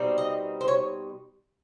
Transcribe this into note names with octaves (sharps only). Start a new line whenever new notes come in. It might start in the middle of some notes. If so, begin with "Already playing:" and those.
Already playing: B2 G3 C4 D#4
D#5
C5
C#5